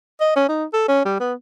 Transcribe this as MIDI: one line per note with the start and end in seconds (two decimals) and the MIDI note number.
0.20 0.34 75
0.36 0.45 61
0.49 0.64 63
0.73 0.86 69
0.88 1.02 61
1.05 1.18 55
1.20 1.33 59